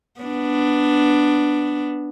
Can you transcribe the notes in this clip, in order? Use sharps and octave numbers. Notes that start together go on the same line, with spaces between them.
B3 D4